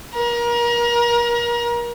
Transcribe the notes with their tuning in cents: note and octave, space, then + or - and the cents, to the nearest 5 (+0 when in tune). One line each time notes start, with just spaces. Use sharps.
A#4 +30